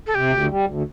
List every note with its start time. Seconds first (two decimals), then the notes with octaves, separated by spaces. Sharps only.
0.07 A4
0.15 C3 G4
0.32 D2
0.50 G3
0.67 D2